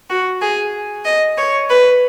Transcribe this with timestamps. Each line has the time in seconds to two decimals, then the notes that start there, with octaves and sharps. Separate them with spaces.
0.09 F#4
0.41 G#4
1.05 D#5
1.37 C#5
1.69 B4